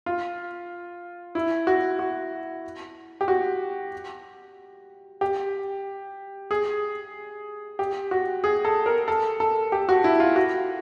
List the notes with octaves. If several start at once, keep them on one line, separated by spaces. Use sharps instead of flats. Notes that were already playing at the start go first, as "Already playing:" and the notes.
F4
E4
F#4
F#4
G4
F#4
G4
G#4
G4
F#4
G#4
A4
A#4
A4
A4
G4
F#4
E4
F4
F#4